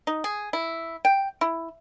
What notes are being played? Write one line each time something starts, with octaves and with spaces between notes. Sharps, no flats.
D#4
G#4
E4
G5
E4